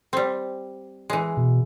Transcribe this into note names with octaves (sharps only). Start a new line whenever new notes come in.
G3 C4
E3 G#3
B2